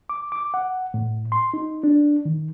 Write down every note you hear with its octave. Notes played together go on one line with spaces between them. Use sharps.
D6
D6
F#5
A2
C6
D#4
D4
D#3